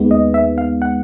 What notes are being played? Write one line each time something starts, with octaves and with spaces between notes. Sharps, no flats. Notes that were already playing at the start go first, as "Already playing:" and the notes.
Already playing: D#2 D#3 G#3 B3
D#5
E5
F5
F#5